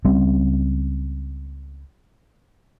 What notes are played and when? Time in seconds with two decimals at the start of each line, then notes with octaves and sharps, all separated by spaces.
0.05 C#2 G3 C4 C#4